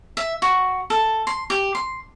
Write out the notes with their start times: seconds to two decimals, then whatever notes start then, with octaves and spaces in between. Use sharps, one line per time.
0.17 E5
0.42 F#4
0.90 A4
1.27 C6
1.50 G4
1.75 C6